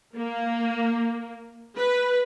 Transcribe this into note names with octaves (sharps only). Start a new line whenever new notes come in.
A#3
B4